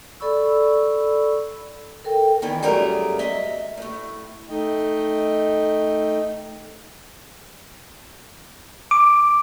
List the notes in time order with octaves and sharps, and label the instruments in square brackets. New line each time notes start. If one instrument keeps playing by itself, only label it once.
[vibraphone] A4 D5 B5 C#6 E6
A4 A#4 G5
[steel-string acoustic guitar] E2 D#3 E3
F#2 G3 A3 G#4 A#4 A#5
D#5 E5
A2 A3
[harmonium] A3 D#4 D#5 G5
[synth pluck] D6